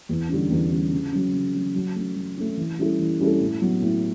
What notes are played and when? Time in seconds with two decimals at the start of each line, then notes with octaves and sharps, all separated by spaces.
0.09 E2
0.29 D3 G3 C#4
0.50 E2
0.71 D3 G3 C#4
0.92 C#3
1.12 F#3 C#4
1.33 C#3
1.54 F#3 C#4
1.75 F#3
1.95 A3 C#4
2.16 F#3
2.37 A3 C#4
2.57 E3
2.79 G3 C#4 E4 A4
2.99 E3
3.20 G3 C#4 E4 A4
3.40 A2
3.62 F#3 B3 F#4
3.82 A2